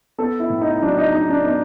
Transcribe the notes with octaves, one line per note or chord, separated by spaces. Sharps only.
B3 A4
E4
A2
D#4
F#3 D4
D#4
D4 D#4
D4
B3 D#4